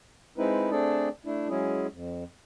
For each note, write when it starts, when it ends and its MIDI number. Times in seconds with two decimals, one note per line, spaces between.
0.38 0.71 56
0.38 0.71 60
0.38 0.71 63
0.38 0.71 64
0.38 0.71 71
0.71 1.09 57
0.71 1.09 60
0.71 1.09 62
0.71 1.09 68
0.71 1.09 69
0.71 1.09 74
1.25 1.49 57
1.25 1.49 62
1.25 1.49 64
1.49 1.87 54
1.49 1.87 56
1.49 1.87 61
1.49 1.87 64
1.49 1.87 68
1.92 2.24 41